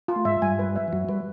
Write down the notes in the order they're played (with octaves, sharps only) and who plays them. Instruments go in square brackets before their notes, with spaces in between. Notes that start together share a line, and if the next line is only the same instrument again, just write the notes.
[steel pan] F4
[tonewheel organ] A3
[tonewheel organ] G#2 G#3 [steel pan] E5
[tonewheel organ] G2 G3 [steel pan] G#5
[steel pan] B4
E5
[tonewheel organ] F3
[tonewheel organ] F#2 F#3 [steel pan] F#4
[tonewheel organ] G3 [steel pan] B4